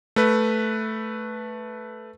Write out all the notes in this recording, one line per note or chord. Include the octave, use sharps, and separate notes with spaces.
A3 B4